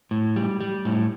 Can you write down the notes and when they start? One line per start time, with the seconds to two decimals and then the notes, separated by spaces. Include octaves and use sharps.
0.11 A2
0.36 G3
0.61 G3
0.85 A2